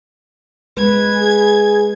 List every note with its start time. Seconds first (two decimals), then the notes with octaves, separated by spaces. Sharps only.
0.77 G#3 B4 G#6
1.14 G#4